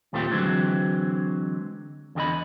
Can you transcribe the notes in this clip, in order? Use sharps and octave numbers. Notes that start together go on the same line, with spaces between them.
D#2 A#2 A3 C4 F4 G4
D3 E3 F#3 G#3 C4
E2 D3 G4 D#5 B5